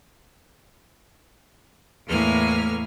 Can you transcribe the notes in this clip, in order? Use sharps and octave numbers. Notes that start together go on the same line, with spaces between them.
E2 A2 A#3 G#5 F6